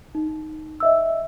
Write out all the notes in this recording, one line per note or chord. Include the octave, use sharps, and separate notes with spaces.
D#4
D#5 E5 E6